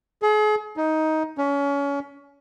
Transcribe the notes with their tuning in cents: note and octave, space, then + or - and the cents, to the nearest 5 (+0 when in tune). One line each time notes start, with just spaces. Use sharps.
G#4 +40
D#4 +15
C#4 +30